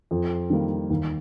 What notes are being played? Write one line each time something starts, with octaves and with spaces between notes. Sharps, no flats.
F2
D#3 G3 A#3
D#2